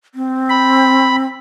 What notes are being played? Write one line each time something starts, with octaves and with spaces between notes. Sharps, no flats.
C4
B5